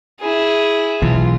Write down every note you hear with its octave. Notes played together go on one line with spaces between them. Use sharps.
E4 G#4
B1 E3 F4